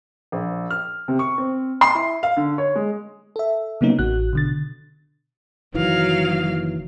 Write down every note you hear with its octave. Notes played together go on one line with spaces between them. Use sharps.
A#1
F6
C3
C#6
C4
C6
E4
F5
D3
C#5
G#3
A4 E5
C#3 F#3 A#3 B3 C#4 D#4
A1 F#4 F#6
B2 D3 A6
F#1 D#3 E3 F#3 F5